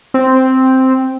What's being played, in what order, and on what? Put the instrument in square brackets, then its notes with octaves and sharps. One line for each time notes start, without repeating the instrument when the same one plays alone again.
[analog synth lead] C4